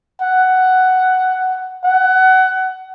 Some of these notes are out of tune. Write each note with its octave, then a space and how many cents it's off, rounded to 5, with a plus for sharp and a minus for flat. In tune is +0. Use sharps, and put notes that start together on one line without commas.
F#5 +10
F#5 +20